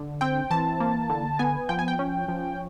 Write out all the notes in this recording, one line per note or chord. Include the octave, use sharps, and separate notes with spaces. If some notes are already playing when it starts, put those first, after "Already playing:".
Already playing: D3
C4 G5
E3 A5
A#3
D3
B3 G#5
F3 G5
G#5
G5
C#4
F3